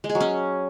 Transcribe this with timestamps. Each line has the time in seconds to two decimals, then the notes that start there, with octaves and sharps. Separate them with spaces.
0.04 G#3
0.09 G#4
0.15 F#3
0.20 C#4